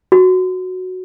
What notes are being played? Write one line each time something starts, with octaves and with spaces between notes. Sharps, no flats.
F#4